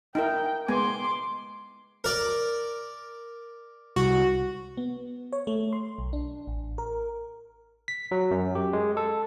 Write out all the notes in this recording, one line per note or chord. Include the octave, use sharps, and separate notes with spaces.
D#4 E4 A#4 G5
G#3 B3 G#5 C6 D6
A#4 D5
C2 F#4
B3
C#5
A3
C6
B1
D4
A1
A#4
B6
F#3
F#2
G4
G#3
A4